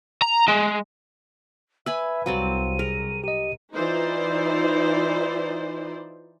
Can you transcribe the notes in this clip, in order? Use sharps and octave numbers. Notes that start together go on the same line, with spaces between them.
A#5
G#3
B4 E5 G#5 B5 E6
C2 F#3 C4 F#4 D5 F5 D#7
G#4 A#4
G4 D#5 D#7
E3 D#4 F4 C5 D5